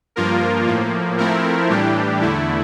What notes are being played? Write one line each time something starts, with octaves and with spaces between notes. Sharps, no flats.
G2 F3 A#3 F4 A#4
A2 F3 A#3
F3 A3 C4 E4 A#4
A2 E3 G3 D4 G4
E2 D3 A3 E4